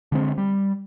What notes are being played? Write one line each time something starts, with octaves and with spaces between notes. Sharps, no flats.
D3 G#3 C4
G3